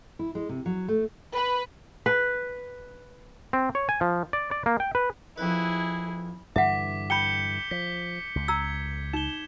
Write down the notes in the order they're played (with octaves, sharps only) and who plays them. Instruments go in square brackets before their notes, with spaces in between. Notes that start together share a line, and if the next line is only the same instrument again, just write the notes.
[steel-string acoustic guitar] E4
G#3
C3
F#3
A3
[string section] B4
[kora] B4
[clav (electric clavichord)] C4
C#5
G#5
F3
D5
D5
A#3
G5
B4
[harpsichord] F2 B4 [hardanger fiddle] E4 G#4
[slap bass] G2 D3 E3 [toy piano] E5 F#5 [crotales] D6 B6
[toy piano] G5 B5 [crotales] G6 C#7 G7
[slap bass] F3 [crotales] B6
[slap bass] C#2
[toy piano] A#5 E6 [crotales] G#6
[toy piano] D#4 [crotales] E7 G7